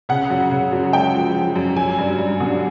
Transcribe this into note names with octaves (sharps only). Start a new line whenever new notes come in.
C#3 F#5
F#2
C#3
F#2
G#3 G5
F3
F3
F#2
F#3 G#5
G2
G2
D3